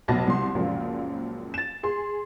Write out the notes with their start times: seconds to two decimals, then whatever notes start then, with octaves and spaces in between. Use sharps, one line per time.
0.08 F1 B1 F#3 A5 B5 A#6
0.27 C2 C6
0.55 C#2 F#2 A#2 F3 A#3
1.54 A6 E7
1.83 G#4 C6